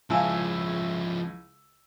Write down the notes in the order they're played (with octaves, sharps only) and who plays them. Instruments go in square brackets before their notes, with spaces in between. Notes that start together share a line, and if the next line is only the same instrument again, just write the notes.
[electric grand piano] C#2 E4 E6 [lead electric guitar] F3 C#4 [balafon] F5 G#5 A5